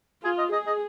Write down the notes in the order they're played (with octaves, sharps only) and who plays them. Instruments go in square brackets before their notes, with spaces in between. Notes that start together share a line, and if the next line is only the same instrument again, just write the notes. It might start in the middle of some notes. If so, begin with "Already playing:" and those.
[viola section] F4 [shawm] G#4
[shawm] D#5
[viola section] G#4 [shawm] D#5
[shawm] D#5